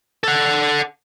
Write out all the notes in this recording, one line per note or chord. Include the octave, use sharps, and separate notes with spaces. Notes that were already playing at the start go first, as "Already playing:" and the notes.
A4 F#5